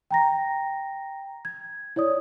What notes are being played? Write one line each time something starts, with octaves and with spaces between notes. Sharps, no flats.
G5 A#5 A#6
G#6
E4 C#5 D5 D#6